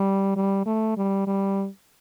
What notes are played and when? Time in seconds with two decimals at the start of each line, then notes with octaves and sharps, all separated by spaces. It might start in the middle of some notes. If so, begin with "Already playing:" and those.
Already playing: G3
0.36 G3
0.66 A3
0.97 G3
1.27 G3